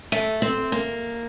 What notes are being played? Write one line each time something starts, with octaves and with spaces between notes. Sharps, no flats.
A3
C4
A#3